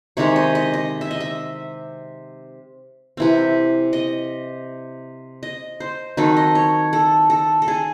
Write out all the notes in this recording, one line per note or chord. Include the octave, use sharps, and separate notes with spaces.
C3 D#3 G#3 C4 C#5
D#5
D#5
D#5
E5
D#5
E5
C3 E3 C4
D#5
D#5
C5
D#3 F#3 C4 A4
D#5
C#5
A4
A4
A4
G#4